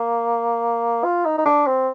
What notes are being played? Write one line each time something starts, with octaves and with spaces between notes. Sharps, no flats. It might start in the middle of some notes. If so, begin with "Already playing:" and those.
Already playing: A#3
F4
D#4
D#4
D4
C4